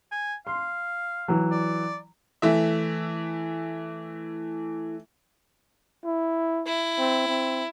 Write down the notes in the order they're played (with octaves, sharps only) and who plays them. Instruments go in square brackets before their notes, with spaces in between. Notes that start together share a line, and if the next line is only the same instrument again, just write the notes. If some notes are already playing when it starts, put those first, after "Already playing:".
[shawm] G#5
[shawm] F5 [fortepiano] C6
[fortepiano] E3 F#3
[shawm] D5
[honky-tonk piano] E3 A3 E5
[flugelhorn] E4
[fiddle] E4
[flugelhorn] C4
C4